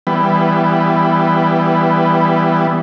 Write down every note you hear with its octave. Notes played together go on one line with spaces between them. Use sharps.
E3 G3 B3